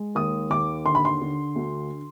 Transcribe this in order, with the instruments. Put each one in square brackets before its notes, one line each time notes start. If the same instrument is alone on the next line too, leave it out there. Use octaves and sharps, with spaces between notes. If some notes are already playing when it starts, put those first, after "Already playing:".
Already playing: [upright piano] G#3
D#2 D#6
D#2 D6
D3 C6
B5
C6
D3
D2